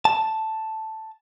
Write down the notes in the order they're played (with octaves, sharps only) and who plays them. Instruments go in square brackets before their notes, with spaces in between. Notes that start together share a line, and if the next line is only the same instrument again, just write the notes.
[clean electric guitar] A5